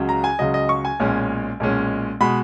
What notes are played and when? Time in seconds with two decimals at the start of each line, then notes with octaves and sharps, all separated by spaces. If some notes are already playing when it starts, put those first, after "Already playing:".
Already playing: C#2 C#3 F#3
0.09 A#5
0.24 G#5
0.39 C#2 C#3 F#3 D#5
0.54 D#5
0.69 C#6
0.85 G#5
1.00 B1 A#2 G#3 C#4
1.60 B1 A#2 G#3 C#4
2.21 B2 G#3 B5